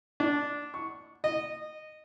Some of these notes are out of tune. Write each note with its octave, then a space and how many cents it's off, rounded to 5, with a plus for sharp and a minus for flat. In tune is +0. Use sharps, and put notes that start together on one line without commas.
D4 -10
C#6 +0
D#5 -15